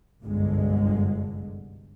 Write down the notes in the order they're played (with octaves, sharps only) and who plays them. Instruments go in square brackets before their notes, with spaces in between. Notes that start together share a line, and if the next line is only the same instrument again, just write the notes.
[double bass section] G1 C2 F#2 D3 G#3